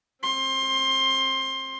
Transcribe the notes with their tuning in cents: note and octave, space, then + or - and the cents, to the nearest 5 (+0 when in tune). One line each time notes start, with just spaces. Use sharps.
C4 +30 C6 +20